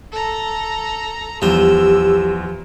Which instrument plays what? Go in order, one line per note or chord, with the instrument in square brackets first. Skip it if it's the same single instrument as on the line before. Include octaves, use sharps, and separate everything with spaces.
[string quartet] A4 A#5
[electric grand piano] E2 G3 [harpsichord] F3 C5 [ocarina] G4 [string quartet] E6